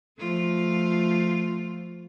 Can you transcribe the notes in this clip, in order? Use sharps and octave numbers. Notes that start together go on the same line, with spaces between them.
F3 A3 F4